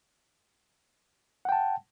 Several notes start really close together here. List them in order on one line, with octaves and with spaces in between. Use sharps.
F#5 G5 A5